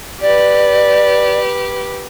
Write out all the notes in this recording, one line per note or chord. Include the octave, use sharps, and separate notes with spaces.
G4 B4 D5